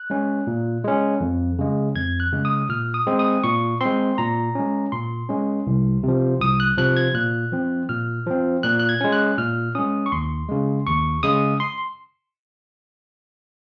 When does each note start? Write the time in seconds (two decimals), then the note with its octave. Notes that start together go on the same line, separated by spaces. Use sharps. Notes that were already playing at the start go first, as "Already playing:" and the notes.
Already playing: F#6
0.10 G#3 C#4
0.47 A#2
0.84 G#3 C#4
1.21 F2
1.59 C#3 G#3
1.95 F2 G#6
2.20 F#6
2.32 C#3 G#3
2.45 D#6
2.69 A#2 F6
2.94 D#6
3.07 G#3 C4
3.19 D#6
3.44 A#2 C#6
3.81 G#3 C4 C6
4.18 A#2 A#5
4.55 G#3 C#4
4.92 A#2 C6
5.29 G#3 C#4
5.67 C2
6.03 C3 F3
6.41 C2 D#6
6.60 F#6
6.78 C3 F3 F#6
6.97 G#6
7.14 A#2 F#6
7.52 F3 C4
7.89 A#2 F6
8.27 F3 C4
8.63 A#2 F#6
8.79 F#6
8.89 G#6
9.01 G#3 C#4
9.12 F#6
9.38 A#2 F6
9.75 G#3 C#4 D#6
10.06 C#6
10.12 D#2 C6
10.49 C#3 G#3
10.86 D#2 C#6
11.23 C#3 G#3 D#6
11.60 C6